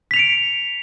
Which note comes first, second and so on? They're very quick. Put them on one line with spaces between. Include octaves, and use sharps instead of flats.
B6 F7 C#7 D7